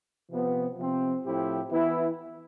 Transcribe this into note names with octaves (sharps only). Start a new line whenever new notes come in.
C3 F3 B3
C3 F3 C4
A2 F3 C4 E4 G4
E3 B3 E4